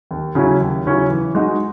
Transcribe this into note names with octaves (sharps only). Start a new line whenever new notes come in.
D#2
C#3 F#3 C#4 E4
D#2
C#3 F#3 C#4 E4
E3
G#3 D#4 F#4